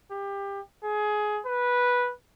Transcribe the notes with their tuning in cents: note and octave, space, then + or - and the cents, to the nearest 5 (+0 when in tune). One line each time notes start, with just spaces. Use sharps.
G4 +25
G#4 +20
B4 -10